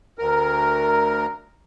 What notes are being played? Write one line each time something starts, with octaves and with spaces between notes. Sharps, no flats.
D2 A#4